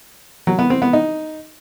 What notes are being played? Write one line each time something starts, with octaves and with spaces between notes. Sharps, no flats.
F#3
B3
C4
B3
D#4